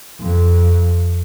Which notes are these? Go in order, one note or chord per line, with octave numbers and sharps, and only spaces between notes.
F2